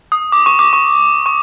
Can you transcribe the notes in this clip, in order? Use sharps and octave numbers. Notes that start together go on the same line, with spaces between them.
D#6
D6
C#6
D6
C#6
C#6